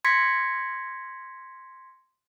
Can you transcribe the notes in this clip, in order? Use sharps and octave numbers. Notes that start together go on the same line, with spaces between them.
C6 G#6 A#6 B6 C#7